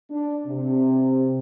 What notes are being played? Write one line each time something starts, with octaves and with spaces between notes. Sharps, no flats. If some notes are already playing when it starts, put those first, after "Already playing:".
D4
C3